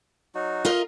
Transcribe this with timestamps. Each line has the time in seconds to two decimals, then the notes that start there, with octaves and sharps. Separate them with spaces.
0.35 F#3 D#4 F#4
0.65 F4 A#4 D#5